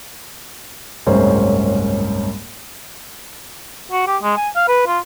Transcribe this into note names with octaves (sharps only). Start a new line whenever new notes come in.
F#1 C2 G#2 C#4 C5
F#4
G4
G#3
G#5
F5
B4
F4